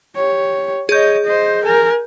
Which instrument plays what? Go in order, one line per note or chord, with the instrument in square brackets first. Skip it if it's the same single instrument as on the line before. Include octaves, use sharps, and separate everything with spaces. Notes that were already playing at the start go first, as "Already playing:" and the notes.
[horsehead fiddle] G4 C#5
[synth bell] G#4 G6 [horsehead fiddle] C#5 D#5
[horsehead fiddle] C5 D#5
A#4 G#5